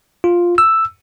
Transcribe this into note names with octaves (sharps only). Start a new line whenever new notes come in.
F4
E6